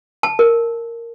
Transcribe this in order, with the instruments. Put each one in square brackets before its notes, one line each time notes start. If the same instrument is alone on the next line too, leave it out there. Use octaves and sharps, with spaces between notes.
[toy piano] A5
A#4